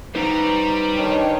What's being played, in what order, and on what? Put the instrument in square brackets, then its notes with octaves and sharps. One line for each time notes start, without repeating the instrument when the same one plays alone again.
[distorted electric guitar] G3 [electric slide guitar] D#4 B4 C5 [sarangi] A#5
[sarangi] D#3 [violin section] D4 C#5 G5